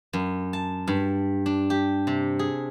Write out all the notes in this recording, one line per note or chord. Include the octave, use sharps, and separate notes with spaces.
F#2
A5
G2
D4
G4
C3
G#4